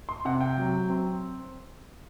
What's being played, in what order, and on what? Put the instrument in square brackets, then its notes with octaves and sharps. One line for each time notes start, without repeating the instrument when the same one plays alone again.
[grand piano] C6
C3 F#5
G5
F#3
C4